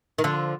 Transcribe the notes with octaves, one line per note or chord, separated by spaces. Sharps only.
D#3
D3 F3